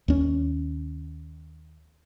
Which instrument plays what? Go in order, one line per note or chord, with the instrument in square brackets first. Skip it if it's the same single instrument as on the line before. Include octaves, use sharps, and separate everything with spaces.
[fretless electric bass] D#2 C#4